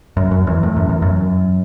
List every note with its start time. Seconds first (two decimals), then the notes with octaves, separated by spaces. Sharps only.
0.17 F#2
0.31 F#2
0.47 E2
0.63 A2
0.76 F#2
0.89 E2
1.02 F#2